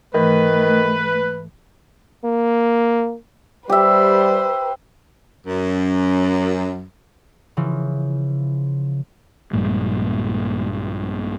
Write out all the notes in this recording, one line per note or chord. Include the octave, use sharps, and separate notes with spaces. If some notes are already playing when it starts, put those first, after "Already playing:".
G#2 D#3 E3 A3 B4
A#3
G3 G4 B4 C5 E5
F#2
C#3 E3 F3
A#1 G2 A#2 G#3